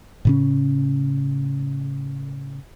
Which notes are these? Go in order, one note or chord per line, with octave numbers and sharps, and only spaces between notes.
A2 C#3 C#4